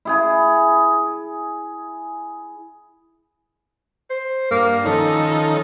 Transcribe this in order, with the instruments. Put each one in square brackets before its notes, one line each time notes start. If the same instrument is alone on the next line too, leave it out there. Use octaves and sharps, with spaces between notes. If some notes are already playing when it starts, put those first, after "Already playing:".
[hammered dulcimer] E4 G#4 G#5
[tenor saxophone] C5
[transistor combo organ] G2 [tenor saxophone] A#3
[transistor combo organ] D#3 F3 D#4 [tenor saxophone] C#4 [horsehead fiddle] A4